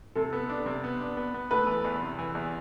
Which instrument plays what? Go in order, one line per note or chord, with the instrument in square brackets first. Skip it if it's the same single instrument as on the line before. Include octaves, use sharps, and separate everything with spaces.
[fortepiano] C3 [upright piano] A4
[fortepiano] B3
D4
C3
B3
D4
B3
B3
[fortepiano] A3 [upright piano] B4
[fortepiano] E3
E2
C3
E3
E2